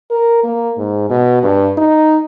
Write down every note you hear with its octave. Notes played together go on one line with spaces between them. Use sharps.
A#4
A#3
G#2
B2
G2
D#4